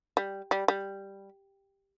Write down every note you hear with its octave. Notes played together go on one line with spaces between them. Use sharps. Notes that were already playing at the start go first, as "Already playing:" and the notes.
G3
G3
G3